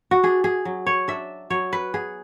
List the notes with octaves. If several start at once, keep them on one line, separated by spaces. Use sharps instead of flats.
F#4
D4 G#4
G#4
F#3
C#5
D4 E5
F#3 C#5
B4
B3 G#4